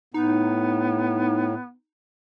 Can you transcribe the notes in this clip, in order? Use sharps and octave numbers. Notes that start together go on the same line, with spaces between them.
A2 B3 D#4